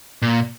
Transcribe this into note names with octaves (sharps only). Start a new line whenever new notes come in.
A#2